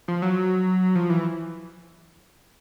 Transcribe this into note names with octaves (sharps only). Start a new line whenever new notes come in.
F3
F#3
F3
E3